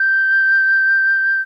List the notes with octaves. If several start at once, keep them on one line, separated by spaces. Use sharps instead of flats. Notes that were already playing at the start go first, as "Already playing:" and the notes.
Already playing: G6